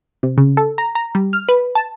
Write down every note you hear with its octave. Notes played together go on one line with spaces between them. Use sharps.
C3
C#3
A4
A#5
A#5
G3
F6
B4
A5